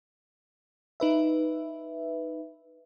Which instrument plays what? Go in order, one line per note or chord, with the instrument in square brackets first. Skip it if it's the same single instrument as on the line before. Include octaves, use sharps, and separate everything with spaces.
[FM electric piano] D#4 B4 E5